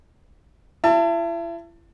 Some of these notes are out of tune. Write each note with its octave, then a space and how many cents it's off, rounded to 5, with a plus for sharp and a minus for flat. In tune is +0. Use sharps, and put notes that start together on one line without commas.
E4 +35 A5 +25